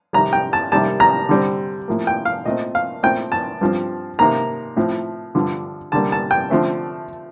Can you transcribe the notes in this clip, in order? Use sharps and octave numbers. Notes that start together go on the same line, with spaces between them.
C3 D#3 G3 A#5
G5
A5
C3 D#3 G3 A#3 A5
A#5
D3 G3 C4
A2 F3 A#3
G5
F5
A#2 A3 C4 D#5
F5
A#2 A3 C4 G5
A5
G2 F3 C4
C3 D#3 A#3 A#5
A2 F3 C4
G2 D3 F3
D3 G3 A#3 A5
A5
G5
D3 F3 A3 C4